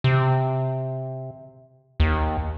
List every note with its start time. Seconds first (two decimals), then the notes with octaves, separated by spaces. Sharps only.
0.04 C3
2.00 D#2